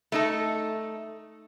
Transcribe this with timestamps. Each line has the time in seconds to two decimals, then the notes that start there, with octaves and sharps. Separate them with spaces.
0.12 A3 D#4 A4